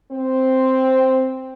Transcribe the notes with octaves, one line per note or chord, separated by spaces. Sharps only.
C4